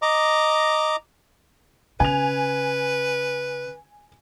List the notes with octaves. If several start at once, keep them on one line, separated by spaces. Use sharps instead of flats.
D#5 A#5 D6
C#3 B4 G#5 F7